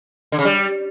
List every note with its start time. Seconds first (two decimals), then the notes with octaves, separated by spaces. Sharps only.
0.32 D3
0.39 C#3
0.45 G3